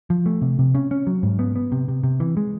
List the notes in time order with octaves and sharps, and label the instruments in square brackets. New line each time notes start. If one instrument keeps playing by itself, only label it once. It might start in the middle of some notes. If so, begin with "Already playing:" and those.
[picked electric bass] F3
A3
C3
C3
C#4
C#4
F#3
G#2
B3
B3
C3
C3
C3
E3
G#3